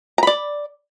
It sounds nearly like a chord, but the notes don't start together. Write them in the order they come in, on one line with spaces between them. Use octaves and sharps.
A#5 B5 D5